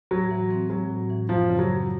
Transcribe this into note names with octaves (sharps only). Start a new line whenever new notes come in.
A2 F#3
E3
C4
F#3 G#3
A2
E3
F#2 F3
C#3
F#3
F#2